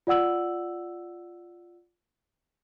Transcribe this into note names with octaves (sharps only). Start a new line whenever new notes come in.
F4 D5 F#5 E6 F#7